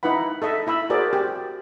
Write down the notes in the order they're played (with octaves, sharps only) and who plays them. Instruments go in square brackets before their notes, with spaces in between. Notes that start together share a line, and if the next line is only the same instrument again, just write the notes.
[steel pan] D#4 E4 B4 F#5 B5
A4 D#5 E5
E4 E5 B5 E6
F#4 G#4 A#4 C5 D5
G4